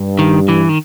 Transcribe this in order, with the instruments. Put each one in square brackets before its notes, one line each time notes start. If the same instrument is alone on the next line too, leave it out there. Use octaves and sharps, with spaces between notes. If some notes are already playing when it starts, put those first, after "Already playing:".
Already playing: [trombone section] G2
[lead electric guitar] D#3
E3
D#3